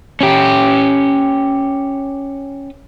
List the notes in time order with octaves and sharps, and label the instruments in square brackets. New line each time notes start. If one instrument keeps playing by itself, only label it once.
[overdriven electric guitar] C#4 G4